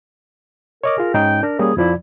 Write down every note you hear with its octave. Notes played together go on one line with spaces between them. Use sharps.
A#4 C#5 D#5 D6
F4 G#4
G#2 C#4 D#4 G5
D4 A#4
G3 A#3 C#4 G#4
F2 F3 E4 D5